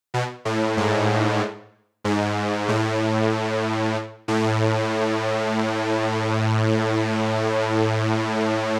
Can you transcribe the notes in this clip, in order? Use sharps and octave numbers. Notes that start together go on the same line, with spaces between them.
B2
A2
G#2
G#2
A2
A2